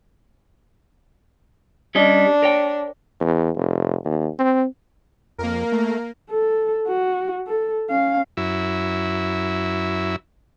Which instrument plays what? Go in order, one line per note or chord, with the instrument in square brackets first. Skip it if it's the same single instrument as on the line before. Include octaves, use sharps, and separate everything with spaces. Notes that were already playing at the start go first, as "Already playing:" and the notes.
[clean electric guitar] G3 C#4 D#5 [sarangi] D4
[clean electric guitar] A#4 C#5 G5
[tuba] E2
F1
D#2
C4
[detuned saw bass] F2 [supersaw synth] A#3 A#4
[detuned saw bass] A3
[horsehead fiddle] A4
F#4
A4
C#4 F5
[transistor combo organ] F#2 E4